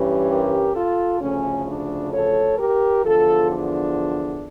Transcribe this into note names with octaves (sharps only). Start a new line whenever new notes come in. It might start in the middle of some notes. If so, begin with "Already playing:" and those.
Already playing: G2 E3 G3 C#4
G4 A#4
F4 A4
D2 C#3 F3 A3 C#4
D4
A4 C#5
G4 A#4
E2 D3 F3 F4 A4
D4